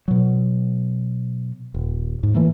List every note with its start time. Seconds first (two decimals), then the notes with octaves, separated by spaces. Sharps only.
0.08 B2 F#3
1.74 D#1
2.23 G#2
2.34 E3 A3 A#3